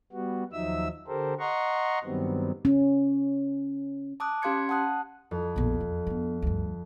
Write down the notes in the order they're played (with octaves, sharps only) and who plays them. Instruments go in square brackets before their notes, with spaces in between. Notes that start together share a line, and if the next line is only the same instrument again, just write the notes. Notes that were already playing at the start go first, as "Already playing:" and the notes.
[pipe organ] G3 B3 F#4
D#2 F3 F#3 D#4 E5 E6
D3 G4 A4 A#4 C5
D#5 F#5 A#5 C6 C#6
G2 D#3 F#3 G3 B3 C4
[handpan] C#4
[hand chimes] A5 D6 D#6 F#6
C#4 G4 F5 C6 G#6 C#7
F#5 A5 D#6 F#6
[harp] F2
[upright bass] A#1 B3
E2
B3 D4
D2 G2